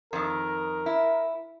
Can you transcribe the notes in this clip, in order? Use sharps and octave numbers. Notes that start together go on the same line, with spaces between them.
F2 D#3 A#4
E4